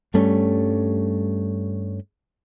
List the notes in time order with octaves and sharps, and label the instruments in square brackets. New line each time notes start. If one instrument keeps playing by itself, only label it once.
[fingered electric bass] G2 G3 A3 C#4